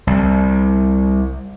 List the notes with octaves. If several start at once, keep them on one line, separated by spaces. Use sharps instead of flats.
C2